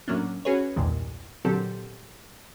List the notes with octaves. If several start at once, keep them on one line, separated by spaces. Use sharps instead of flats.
A2 F#3 A#3 C#4 D4
C#4 F#4 G#4 B4 C#5
B1 E2 G2 A#2 D#3 G#3
A#2 D3 F#3 C4 G4 A4